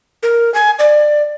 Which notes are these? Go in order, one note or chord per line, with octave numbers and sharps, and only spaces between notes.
A#4
G#5
D5